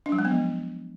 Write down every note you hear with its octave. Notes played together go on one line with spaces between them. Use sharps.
D4
F#3
G#3
B3
F3